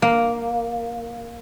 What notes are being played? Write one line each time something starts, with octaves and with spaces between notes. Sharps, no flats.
A#3